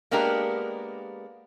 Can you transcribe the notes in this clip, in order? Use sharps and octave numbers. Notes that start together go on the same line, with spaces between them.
G#3 A#3 B3 D4 G4 A#4